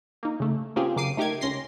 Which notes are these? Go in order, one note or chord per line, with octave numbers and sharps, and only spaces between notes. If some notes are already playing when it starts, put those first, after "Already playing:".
A#3 D#4
C#3 A3
A#3 C4 C#4 F4 G4 G#4
F#2 C#3 A#3 D6 C7 D#7
A3 D#4 G4 A#4 D6 G#6
C#2 C#4 C6 A#6 C7